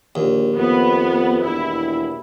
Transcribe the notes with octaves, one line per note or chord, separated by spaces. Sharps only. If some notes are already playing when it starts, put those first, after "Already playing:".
A#1 D#2
F2 B3
E1 E4